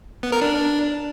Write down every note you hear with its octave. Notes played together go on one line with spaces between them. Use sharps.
B3
A#4
D4